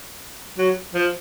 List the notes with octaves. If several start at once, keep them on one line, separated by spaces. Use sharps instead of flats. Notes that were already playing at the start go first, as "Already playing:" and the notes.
F#3
F3